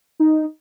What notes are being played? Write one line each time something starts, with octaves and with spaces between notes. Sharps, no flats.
D#4